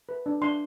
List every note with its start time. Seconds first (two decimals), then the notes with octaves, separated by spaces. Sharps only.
0.09 B4
0.26 D4
0.42 D4 C6